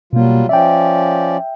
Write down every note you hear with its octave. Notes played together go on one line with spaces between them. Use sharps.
B2 F#3 G3 A#3 F4
F3 C#4 D5 E5 G5